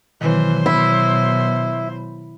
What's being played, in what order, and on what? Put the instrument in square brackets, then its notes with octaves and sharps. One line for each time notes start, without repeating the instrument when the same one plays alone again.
[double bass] B2 E3 [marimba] D#3 [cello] F#3 C5
[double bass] B2 [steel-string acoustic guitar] E4